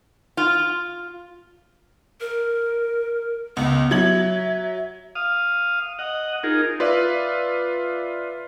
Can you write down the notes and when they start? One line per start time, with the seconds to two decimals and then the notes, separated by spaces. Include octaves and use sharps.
0.37 F4
2.21 A#4
3.57 C#2 B3
3.91 F#3 E5 G#6 F#7
5.15 F5 D#6
5.99 D#5 F#5
6.43 D#4 F4 G#4 A#4
6.80 F4 B4 D5 E5